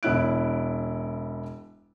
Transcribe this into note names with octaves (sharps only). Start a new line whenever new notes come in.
E1 C#4 E4 F#6 D7